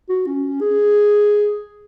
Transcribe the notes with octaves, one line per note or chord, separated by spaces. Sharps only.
F#4
C#4
G#4